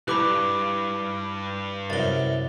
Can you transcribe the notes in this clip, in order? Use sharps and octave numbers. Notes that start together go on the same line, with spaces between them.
B1 G2 E4 G4 B4 B5 D6 F#6
C2 F#2 A#4 A6 G7